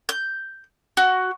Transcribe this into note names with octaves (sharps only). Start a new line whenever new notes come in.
G6
F#4